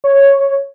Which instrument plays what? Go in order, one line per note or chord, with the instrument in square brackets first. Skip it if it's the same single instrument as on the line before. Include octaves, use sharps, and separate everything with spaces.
[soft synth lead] C#5